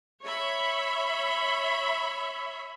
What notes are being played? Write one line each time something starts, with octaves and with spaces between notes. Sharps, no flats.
C#5 E5 B5